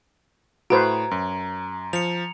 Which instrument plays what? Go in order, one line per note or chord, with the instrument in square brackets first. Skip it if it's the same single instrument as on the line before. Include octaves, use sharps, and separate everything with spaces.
[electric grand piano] A2 D7 [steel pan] F#4 B4 C5 [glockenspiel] A#5 G#6
[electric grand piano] F#2
[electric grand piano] F3 [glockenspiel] C#7 F7